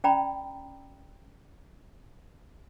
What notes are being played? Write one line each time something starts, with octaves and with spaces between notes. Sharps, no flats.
C#4 D5 G5 A#5 B5